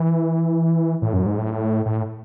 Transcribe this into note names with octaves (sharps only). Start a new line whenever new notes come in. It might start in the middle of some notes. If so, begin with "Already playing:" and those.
Already playing: E3
A2
F#2
G#2
A2
A2